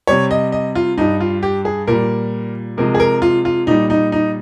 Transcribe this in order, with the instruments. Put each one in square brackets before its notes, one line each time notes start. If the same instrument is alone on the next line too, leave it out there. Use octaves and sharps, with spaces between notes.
[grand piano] C3 G3 C#5
D#5
D#5
F4
G2 G3 D#4
F4
G4
G#4
A#2 G3 A#4
C3 F3 G#3 A#4
G#4
A#4
F4
F4
A#2 G3 D#4
D#4
D#4